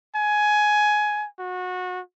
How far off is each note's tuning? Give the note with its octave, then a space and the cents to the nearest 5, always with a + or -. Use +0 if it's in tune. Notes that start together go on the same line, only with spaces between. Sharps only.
G#5 +15
F#4 -25